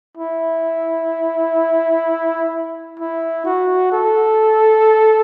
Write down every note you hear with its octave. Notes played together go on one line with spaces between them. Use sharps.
E4
E4
F#4
A4